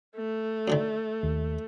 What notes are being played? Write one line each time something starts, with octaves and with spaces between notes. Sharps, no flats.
A3
F#2 D3 D#3
D#2